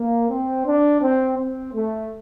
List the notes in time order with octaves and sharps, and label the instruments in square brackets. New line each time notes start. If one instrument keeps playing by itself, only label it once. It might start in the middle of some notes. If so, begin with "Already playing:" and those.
Already playing: [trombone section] A#3
C4
D4
C4
C4
A3